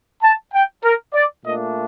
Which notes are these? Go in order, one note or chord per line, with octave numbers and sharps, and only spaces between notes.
A5
G5
A#4
D5
A#2 A3 D4 D#5